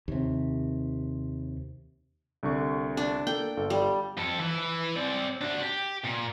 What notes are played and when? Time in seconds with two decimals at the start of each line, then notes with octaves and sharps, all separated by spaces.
0.08 D#2 C3
2.43 C2 D3 C#6
2.97 D4
3.27 A#3 A4 G5
3.57 G1 A4 F5
3.70 G3
4.17 F2 A4
4.39 E3 E4
4.96 C4 D5
5.41 D4 F#4
5.62 G4
6.05 A#2